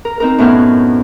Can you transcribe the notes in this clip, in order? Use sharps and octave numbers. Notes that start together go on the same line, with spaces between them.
A#4
C4 D#4 A#4
F#2 A2 B3 C4 F6 G6